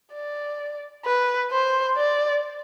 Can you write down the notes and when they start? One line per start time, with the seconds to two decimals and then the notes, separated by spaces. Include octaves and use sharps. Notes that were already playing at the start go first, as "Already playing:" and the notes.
0.13 D5
1.05 B4
1.51 C5
1.97 D5